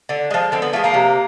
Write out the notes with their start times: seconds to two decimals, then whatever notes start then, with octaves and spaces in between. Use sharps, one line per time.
0.09 D3
0.31 F3 G#3
0.52 D3 C4
0.62 B3
0.73 F3 G#3 A3
0.84 A#3
0.94 C3